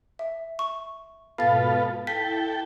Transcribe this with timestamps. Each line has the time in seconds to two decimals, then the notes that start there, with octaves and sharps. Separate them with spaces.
0.19 E5
0.59 C#6
1.38 G#2 B2 B3 F4 A4 F5 A6
2.07 E4 A4 G5 B6